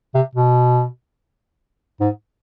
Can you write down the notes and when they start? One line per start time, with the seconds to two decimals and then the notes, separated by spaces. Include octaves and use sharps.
0.14 C3
0.35 B2
2.00 G#2